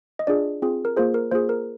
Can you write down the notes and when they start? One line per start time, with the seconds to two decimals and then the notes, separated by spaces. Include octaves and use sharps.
0.19 D#5
0.27 D4 F4 G#4 D5
0.62 C4 F4 G#4
0.85 A#4
0.97 A#3 F4 G#4 C5
1.14 A#4
1.31 A#3 F4 G#4 C5
1.49 A#4